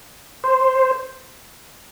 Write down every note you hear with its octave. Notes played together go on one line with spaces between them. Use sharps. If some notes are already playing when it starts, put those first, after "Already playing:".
C5